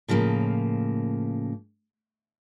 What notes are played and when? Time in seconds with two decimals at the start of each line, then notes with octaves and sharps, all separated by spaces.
0.08 A2 C#3 F3 G#3 A#3